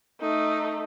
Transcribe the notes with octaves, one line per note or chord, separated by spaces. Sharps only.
A3 D#4